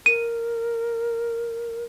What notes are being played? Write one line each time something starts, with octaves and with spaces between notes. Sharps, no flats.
A#4 D#7